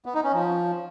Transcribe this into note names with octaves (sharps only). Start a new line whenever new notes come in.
B3
D#4
C#4
F3